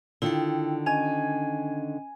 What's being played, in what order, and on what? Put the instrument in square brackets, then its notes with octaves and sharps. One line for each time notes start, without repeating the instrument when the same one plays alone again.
[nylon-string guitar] D3 D#3 F4 [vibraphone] E4 G5
[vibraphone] C#4 D#5 [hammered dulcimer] G#5